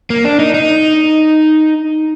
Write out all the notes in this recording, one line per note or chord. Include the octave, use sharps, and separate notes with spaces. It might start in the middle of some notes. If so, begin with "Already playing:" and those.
A#3
D4
D#4
D#4